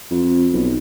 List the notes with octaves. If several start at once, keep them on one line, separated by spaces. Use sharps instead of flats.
F2
B1